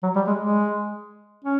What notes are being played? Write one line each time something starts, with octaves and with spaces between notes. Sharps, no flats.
F#3
G3
G#3
G#3
C#4